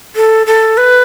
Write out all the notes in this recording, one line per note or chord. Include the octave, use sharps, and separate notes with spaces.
A4
A4
B4